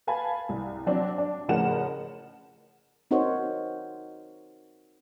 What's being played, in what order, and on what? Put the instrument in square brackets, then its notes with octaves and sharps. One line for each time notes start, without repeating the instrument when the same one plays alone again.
[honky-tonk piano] B4 F5 G#5 A5 B5
C2
F#3 C4 D4
D4
A1 C#3 F3 A#4 F#5 E7
[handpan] C4 D#4 F#4 A#4 C5 C#5